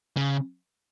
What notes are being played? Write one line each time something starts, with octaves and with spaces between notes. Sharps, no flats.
C#3